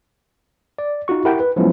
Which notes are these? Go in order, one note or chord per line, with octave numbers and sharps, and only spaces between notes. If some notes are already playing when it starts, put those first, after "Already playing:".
D5
D#4 F4 F#4 C#6
E4 G4 A#4 E5 F#5 G5
B4
F3 F#3 G#3 B3 C#4 E4